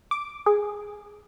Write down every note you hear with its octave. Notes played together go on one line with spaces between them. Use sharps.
D6
G#4